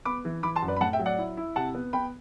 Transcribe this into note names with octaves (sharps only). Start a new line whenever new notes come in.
B3 B5 D6
E3
E3 B5 D6
A5 C6
F#2
B4 D5
B5
A2 F#5 A5
E5 G5
F#3
D5 F#5
E4
E4
C3 F#5 A5
B3
B3 G5 B5